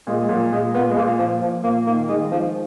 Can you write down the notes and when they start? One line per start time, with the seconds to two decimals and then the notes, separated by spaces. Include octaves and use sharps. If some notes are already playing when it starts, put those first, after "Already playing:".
0.07 A#2 G#3
0.20 G#3
0.29 A#2 F#3
0.52 A#2 G#3
0.74 A#2 B3
0.90 G#3
0.96 A#2 A#3
1.19 A#2 F3
1.41 A#2 F3
1.63 A#2 A#3
1.87 D#3 A#3
2.08 D#3 G#3
2.31 F3 G#3